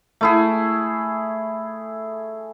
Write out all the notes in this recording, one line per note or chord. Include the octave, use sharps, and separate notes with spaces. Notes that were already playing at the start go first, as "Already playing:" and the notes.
A3 E4 G#4